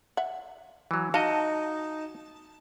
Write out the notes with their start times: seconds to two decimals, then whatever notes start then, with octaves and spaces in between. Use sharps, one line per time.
0.17 E5 F#5
0.91 E3 F#3
1.14 D#4 F#4 D#5 F5 A5